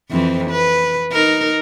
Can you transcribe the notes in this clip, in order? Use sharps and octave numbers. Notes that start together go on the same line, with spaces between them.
F2 E3 C4
B4
D#4 A#4